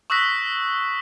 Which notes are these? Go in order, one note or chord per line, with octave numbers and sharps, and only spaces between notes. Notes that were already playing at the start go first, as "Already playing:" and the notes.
C#6 D#6 E6 F#6 A#6 B6